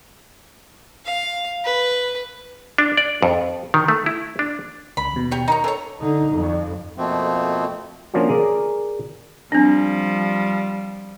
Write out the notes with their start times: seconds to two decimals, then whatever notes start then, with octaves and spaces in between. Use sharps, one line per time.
1.05 F5
1.65 B4
2.78 D4
2.97 D5
3.22 F2
3.74 D#3
3.88 A3
4.06 E4
4.39 D4
4.97 C#2 B5
5.13 D#2 B2
5.31 G4 C#5
5.48 D#4 A#4 C#5
5.64 E3 A4 C#5
6.01 D3 D#4
6.33 F2
6.98 F2 B2 F3 A3 A#3 C4
8.14 F3 A#3 C#4 D4 F4 F#4
8.29 G#4 A#4 D5
9.52 F3 G3 C4 D4